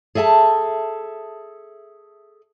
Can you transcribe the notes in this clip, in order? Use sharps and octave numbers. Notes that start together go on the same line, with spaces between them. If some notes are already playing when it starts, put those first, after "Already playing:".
G#4 A4 E5 G#5 A5